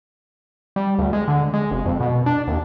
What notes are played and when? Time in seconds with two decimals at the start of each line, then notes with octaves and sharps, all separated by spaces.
0.76 G3
0.99 D2
1.13 G#3
1.28 D3
1.54 G#3
1.71 F1
1.86 F2
2.00 B2
2.26 D4
2.47 D#2